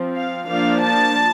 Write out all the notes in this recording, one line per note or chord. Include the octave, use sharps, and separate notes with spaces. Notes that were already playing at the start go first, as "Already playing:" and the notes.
Already playing: F3 C4
F5
F3 A#3 D4 F5
A5